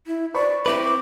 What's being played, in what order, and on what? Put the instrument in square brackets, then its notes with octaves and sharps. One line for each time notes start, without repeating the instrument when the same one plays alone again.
[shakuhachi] E4
[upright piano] C5 B5 C#6 [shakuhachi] D5
[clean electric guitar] C4 E4 B4 [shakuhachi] D6